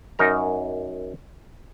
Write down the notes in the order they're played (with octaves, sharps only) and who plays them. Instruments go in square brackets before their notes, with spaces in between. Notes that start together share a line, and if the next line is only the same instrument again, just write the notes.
[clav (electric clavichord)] F#2 D#4 A#4 A#5